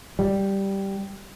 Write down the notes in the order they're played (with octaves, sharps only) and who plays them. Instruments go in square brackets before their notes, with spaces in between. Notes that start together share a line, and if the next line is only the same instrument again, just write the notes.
[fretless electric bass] G3